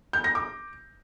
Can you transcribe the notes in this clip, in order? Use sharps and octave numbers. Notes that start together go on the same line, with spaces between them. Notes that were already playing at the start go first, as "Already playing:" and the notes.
G6
A#6
D6